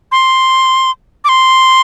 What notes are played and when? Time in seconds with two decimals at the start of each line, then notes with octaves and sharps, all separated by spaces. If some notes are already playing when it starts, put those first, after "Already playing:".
0.12 C6
1.24 D6
1.29 C6